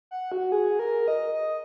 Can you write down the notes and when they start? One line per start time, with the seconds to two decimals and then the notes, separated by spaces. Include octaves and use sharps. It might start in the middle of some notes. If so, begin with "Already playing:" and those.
0.11 F#5
0.32 F#4
0.52 G#4
0.79 A#4
1.08 D#5
1.35 D#5